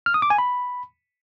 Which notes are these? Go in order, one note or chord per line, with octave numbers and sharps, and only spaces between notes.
F6
D#6
D6
G#5
B5